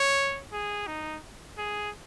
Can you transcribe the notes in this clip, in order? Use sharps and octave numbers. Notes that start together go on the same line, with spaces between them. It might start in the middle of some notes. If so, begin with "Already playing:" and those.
Already playing: C#5
G#4
D#4
G#4